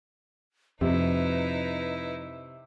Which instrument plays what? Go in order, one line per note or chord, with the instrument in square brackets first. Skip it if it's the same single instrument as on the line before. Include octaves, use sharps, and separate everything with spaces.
[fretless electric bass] F2 [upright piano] C3 [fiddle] D#4 E4 [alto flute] B4